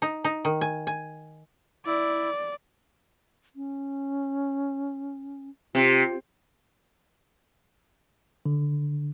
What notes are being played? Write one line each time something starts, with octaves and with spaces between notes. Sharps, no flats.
D#4
D#4
D#3
G#5
G#5
E4 D5
C#4
C3 F4
D3